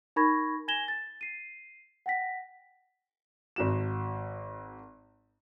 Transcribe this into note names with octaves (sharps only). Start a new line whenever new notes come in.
D#4 A#4 B5 C#6 G#6 A#6
G#5 G#6 A#6 E7 G7
A6
C7 D#7
F#5 G5 A#6 B6
G#1 F#4 E7